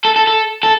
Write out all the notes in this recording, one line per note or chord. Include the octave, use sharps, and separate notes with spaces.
A4
A4
A4
A4